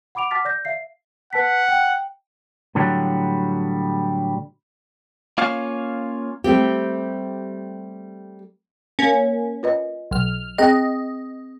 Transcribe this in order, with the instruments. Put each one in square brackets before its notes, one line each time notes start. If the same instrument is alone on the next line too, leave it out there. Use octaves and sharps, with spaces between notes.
[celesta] F#5 B5 D6 D7 F7
F#5 A5 D6 F6 A6 B6
D5 G6 A#6
E5 F5 C7
[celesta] B4 A5 B6 [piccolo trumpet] F#5
[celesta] G5
[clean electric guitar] A2 D3 F#3 G3
A#3 C#4 F4 C#5 F5
[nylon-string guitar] G3 A3 C4 G4
[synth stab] A#3 C#4
[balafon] F4 B4 D#5
[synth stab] B1 F6
[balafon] C4 G#4 G5 [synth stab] D#5